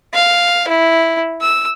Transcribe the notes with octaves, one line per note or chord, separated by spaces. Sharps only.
F5
E4
E6